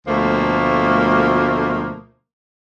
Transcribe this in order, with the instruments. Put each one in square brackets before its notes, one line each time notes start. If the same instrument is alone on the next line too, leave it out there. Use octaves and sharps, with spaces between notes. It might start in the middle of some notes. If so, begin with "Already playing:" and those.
[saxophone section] D2 B2 F3 A3 A#3 C5